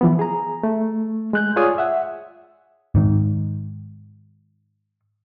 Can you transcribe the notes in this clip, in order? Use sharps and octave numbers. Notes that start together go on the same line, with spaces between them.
E3 F3 B3
G#4 A#5
A3
G#3 F#6 G6
F4 G#4 C#5 D5 G#5 D#6
E5 F#5
G#2 D#3